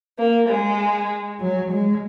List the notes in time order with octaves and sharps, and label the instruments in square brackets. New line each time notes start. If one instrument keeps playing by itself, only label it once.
[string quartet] A#3
G#3
F#3
G#3